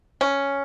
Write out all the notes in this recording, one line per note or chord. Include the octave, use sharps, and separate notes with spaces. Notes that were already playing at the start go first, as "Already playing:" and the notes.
C#4